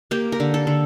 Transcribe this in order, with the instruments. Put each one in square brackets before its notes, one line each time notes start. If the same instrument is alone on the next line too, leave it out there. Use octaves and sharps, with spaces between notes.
[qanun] A#3 G4
A#4
D3
A4
D3